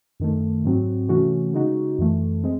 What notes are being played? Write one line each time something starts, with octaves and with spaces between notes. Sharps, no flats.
F#2 D#3 A3
G#2 F#3 C4 F#4
C3 E3 A3 C#4 F#4
C#3 G#3 D#4 F#4
F#2 E3 A3
G#3 C4